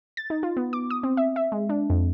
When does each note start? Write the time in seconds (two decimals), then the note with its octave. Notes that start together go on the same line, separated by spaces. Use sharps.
0.17 A6
0.30 D#4
0.43 F4
0.57 B3
0.73 D6
0.90 D#6
1.03 C4
1.17 E5
1.36 E5
1.52 G#3
1.69 D4
1.90 F2